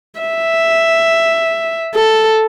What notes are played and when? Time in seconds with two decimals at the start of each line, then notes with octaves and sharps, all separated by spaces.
0.20 E5
1.94 A4